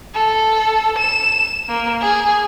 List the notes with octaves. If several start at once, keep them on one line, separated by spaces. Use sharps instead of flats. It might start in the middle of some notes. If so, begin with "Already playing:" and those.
A4
E7
A#3
G#4